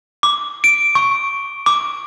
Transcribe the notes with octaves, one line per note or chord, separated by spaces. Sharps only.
D6
D7
C#6
D6